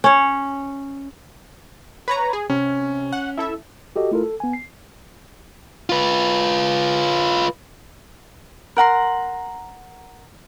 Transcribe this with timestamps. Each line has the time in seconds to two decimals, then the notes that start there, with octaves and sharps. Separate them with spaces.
0.04 C#4 C#5
2.08 B4 C#5 A#5
2.33 G#4
2.50 C3 C#4
3.13 F#5
3.38 E4 A4 E5
3.96 F#4 G4 A4 D#5
4.11 A3 E4 F4 A4 A#4
4.23 A4
4.40 B3 G#5
4.53 C7
5.90 F4 B4
8.77 A#4 F#5 A#5 C6